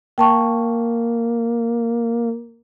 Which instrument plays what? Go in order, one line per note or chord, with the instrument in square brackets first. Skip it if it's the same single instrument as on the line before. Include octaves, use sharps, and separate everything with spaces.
[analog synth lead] A#3 [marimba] G5 A5 C#6